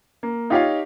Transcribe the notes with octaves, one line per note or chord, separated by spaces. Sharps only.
A#3
D#4 F4 G4 C#5 F5